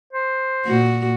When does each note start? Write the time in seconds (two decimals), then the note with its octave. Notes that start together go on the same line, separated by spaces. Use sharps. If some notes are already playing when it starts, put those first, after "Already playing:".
0.13 C5
0.66 A#2 F#4